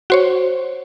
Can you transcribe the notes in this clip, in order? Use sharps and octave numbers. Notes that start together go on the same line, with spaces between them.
F#4 C5 C#5